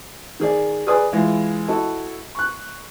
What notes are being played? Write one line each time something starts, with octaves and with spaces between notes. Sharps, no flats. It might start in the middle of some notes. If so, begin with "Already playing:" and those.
D#3 G#4 D5
G#4 B4 D5 G#5 D#6
E3 G#3 E4 F4
E4 F#4 A4 D#5 E5
C#6 F#6